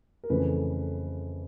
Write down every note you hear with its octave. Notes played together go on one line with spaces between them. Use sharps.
A#4
F2 C#3 E3 A3 B4